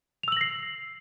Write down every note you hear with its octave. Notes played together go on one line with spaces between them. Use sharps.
E6 A#6 C7 F7 F#7